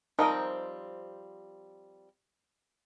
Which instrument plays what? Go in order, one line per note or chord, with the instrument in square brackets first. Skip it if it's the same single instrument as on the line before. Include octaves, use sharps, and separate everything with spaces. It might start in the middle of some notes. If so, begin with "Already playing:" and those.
[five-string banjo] F3 G3 C4 [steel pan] D#4 A#4 D#5